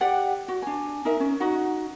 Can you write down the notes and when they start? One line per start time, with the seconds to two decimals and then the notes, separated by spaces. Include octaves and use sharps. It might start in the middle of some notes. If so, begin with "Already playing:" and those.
0.01 G4 D5 F#5 G5
0.48 F#4
0.62 D4 G#5
1.05 D#4 A#4 E5
1.20 C#4
1.40 D#4 F#4 F#5